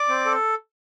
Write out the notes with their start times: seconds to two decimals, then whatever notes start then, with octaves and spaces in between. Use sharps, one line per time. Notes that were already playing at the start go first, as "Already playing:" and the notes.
Already playing: D5 D6
0.09 C4
0.25 A4